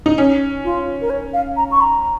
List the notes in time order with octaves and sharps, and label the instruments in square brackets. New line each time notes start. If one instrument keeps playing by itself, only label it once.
[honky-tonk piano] D#4
[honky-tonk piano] C#4 [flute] D#4
[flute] F4
A#4
C#5
F5
A#5
C#6
A#5